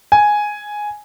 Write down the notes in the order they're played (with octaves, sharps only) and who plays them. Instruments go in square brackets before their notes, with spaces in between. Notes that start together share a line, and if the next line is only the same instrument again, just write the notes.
[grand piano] G#5